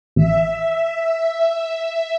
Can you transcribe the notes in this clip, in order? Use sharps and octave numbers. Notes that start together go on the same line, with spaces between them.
A1 E5